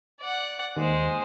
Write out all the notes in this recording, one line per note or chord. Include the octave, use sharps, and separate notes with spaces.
D5 F#5
D#2 G#3 C5